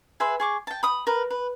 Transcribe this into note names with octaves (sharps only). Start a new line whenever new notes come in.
G#4 B4 E5 C6
G#4 C#6 D6
G5 A5
B5 D#6
A#4 B4
B4